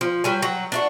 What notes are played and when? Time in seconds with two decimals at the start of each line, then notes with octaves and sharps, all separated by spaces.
0.01 F3
0.24 F#3 G3 G#5
0.42 F#3
0.72 D4 F4 F#4